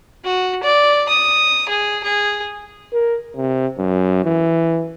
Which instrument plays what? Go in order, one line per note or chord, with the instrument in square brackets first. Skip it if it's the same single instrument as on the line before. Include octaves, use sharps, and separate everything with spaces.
[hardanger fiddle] F#4
D5
D#6
G#4
G#4
[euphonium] A#4
C3
F#2
E3